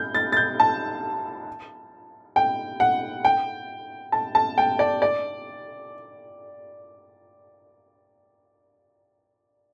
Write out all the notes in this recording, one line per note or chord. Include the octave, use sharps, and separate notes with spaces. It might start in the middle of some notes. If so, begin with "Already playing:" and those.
Already playing: G6
A6
A6
G6
A5
G5
F#5
G5
A5
A5
G5
D5
D5